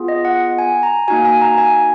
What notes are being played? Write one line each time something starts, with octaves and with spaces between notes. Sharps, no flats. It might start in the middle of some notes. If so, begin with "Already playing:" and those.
Already playing: B3 F4 G#4
D#5
F#5
F#5
G#5
A#5
A#3 D#4 F#4 G#5
G#5
A#5
G#5